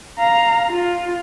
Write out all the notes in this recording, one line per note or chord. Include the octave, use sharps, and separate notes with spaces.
F5 A#5
F4